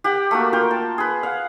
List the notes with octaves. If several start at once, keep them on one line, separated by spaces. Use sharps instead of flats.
G4 F#5 G5
A3 A#3 F#4
F4 A#4 G5
A5
G#4 B4
F5 F#5